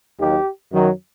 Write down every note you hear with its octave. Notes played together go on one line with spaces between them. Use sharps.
D#2 D#3 F#3 G4
F#2 D#3 F#3